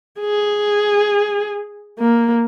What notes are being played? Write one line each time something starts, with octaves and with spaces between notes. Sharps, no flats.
G#4
A#3